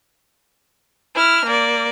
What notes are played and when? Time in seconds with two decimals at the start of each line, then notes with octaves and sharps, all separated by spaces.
1.15 E4 F6
1.46 A#3 D5